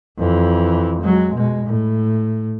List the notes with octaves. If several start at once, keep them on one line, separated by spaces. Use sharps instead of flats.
F2 E3
F#3 G#3
B2 G#3
A2